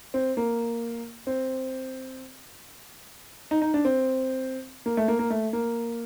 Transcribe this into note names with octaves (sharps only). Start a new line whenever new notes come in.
C4
A#3
C4
D#4
D#4
D4
C4
A#3
A3
A#3
A#3
A3
A#3